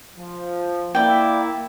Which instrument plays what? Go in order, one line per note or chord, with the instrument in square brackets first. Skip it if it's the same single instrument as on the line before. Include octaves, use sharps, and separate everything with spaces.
[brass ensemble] F3
[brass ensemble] A#3 E4 [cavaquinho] D5 G5